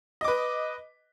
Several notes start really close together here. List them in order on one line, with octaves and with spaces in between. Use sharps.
D#5 D6 B4